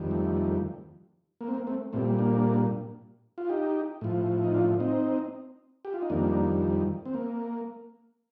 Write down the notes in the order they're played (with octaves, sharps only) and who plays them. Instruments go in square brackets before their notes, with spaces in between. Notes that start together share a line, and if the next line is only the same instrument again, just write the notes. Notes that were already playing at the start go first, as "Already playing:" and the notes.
Already playing: [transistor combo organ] F2 D#3 G3
A3
A#3
C4
A#3
A3 C4
A#2 G3 A3 C4
A#3 D4
F4
D#4 G4
A2 F3
D#4
D4 F4
C4 D#4
G4
F4
D#4
F2 D#3 G3 A#3 D4
C4
A#3